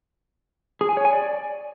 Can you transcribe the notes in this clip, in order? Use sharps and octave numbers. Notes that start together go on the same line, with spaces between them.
G#4
G#5
C#5
G#5
D5